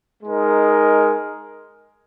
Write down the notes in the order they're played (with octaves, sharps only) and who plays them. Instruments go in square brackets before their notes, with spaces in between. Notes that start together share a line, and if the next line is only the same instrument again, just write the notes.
[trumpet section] G#3 D#4 A#4